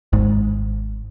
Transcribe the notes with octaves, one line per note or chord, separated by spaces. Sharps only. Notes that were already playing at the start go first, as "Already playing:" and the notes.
G#1 G#2